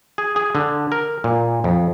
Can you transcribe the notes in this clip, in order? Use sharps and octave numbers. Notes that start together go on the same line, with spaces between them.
G#4
G#4
D3
A#4
A#2
F2